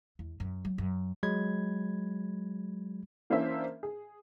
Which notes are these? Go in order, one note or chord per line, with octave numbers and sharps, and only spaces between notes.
E2
F#2
F#3
F#2
F#3 G#3 B5 G#6
E3 A#3 C#4 D4 C5 E5
G#4